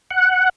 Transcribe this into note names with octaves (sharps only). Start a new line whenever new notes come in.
F#5